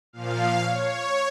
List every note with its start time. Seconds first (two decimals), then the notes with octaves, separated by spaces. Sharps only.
0.13 A#2 F3 F5
0.61 C#5